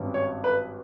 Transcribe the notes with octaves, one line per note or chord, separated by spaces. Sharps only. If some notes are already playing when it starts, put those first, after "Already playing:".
Already playing: G#1 G2 G3 C#4
C#5
B4